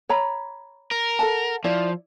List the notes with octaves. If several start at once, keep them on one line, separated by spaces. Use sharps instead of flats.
C#5 A#5 B5
A#4
A4 F#5 A5
F3 E4 D5